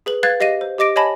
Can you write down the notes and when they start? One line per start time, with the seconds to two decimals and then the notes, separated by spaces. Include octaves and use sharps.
0.06 G#4 B4 F#7
0.23 B4 F5 F#6 G#6 A6
0.40 G4 D#5 F5 A#6 D#7
0.61 C5
0.78 G4 D#5 D6 A#6 D7
0.96 C#5 D#5 G#5 A5 B5 A#6